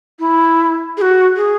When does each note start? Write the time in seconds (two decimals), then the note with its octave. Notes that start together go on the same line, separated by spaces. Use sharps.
0.19 E4
0.97 G#4
1.02 F#4
1.36 G#4